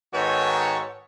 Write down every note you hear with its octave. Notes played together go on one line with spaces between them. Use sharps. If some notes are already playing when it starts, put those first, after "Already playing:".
G#2 D#3 B3 F#4 A4 C#5